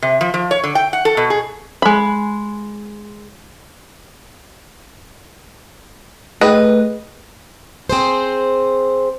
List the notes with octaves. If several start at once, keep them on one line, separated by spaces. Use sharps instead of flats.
C3
F3
F3
C#5
D3
G5
F#5
A4
B2
G#4
G#3 B5
A3 G#4 B4 D#5 G5
C4 G#4 C5